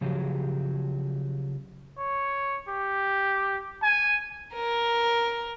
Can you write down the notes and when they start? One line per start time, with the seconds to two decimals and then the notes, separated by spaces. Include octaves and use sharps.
0.01 C#3 F3 F#3 G4 G#4
1.97 C#5
2.68 G4
3.83 G#5
4.55 A#4